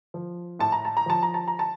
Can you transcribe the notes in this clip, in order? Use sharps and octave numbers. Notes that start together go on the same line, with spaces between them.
F3
A2 A5
A#5
A5
A#5
F3 A5
A#5
A5
A#5
A5